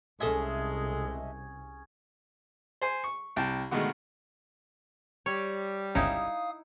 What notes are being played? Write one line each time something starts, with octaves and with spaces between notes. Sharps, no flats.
C2 G#3 C#4 G#4 A4 D#5 E5
C5 G#5
C#6
C2 G5 A5
B2 D3 D#3 G#3 A3
G3 C#5
G1 C#2 C#4 D#4 E4 F5 D#6